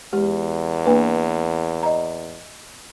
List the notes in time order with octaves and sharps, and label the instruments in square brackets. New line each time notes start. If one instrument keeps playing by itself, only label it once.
[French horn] E2 [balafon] G#3 G4
[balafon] A#3 D4 B4
D#5 A#5